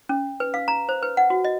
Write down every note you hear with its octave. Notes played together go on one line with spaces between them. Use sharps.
C#4
B4
F5
A#5
C5
B4
F#5
F#4
D#5